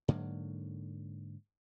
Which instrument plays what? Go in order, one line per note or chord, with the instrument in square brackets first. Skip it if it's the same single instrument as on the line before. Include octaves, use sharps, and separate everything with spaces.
[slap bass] G#2 D3 F#3 A#3